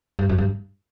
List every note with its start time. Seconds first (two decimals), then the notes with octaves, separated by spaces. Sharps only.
0.19 G2
0.29 F#2
0.38 G2